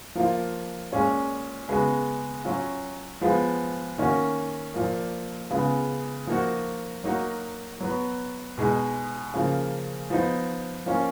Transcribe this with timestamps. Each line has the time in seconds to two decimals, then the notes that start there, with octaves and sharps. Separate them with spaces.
0.15 F3 A#3 F4
0.92 A#2 G#3 C#4 F4
1.68 C#3 G#3 B3 F#4
2.45 F#3 C#4 F4
3.21 F3 G#3 B3 F4
3.98 D#3 A#3 C#4 F#4
4.74 A#2 F3 A#3
5.51 C#3 G#3 B3 F4
6.27 F3 A#3 D#4 F#4
7.04 F#3 A#3 D#4 F#4
7.81 F#3 B3 F#4
8.58 B2 G#3 D#4
9.34 C#3 F3 A#3
10.10 F3 B3 D#4
10.86 F3 A#3 C#4